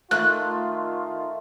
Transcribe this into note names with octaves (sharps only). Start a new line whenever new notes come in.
D#3 A3 F4 F#6